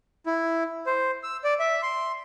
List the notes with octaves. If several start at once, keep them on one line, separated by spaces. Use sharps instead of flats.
E4
C5
E6
D5
E5
C6